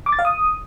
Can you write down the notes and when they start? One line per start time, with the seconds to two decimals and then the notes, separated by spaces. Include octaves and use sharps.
0.06 D6
0.12 A6
0.19 F5
0.25 D#6